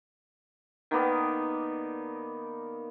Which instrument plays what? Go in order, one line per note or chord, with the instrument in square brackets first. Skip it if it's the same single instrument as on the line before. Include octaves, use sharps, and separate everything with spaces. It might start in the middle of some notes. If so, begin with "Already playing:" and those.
[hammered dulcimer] D#3 A#3 B3 D5